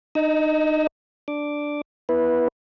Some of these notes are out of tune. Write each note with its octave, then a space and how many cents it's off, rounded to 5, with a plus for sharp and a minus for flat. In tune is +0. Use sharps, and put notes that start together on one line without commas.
D#4 -30 D#5 +15 E6 -40
D4 +0 D6 +0
B3 -15 E4 +0 B4 -15